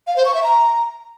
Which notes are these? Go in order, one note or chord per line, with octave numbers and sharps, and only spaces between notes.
F5
C5
C#6
E5
A#5